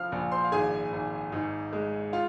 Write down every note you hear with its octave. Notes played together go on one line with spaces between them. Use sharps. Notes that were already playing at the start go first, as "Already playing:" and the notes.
Already playing: F3 F5 F6
A#1
C5 C6
F5
G#1 G#4 G#5
G#1
G#2
G#3
F4 F5